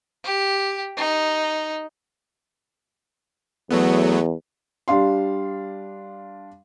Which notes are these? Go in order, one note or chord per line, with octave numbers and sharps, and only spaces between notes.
G4
D#4
E2 F#3 A3 B3
G3 D4 F5 C6